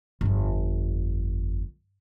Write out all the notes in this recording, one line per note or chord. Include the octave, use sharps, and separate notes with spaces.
G1 F2